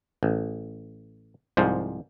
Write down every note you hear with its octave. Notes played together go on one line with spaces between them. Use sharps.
A1
C2 G#2 F3